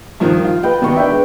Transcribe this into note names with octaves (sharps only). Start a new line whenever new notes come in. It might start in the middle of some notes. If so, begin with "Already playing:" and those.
G2 D#3 F3
F4
B4 D#5 G5
B2 D#3 D#4 D5 A#5 C#6
D4 B4 E5 G5
G#3